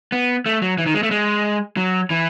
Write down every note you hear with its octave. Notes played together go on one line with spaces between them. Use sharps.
B3
A3
F#3
E3
D#3
G#3
A3
G#3
F#3
E3